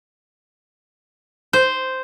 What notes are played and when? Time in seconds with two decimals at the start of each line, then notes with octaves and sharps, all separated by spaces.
1.53 C5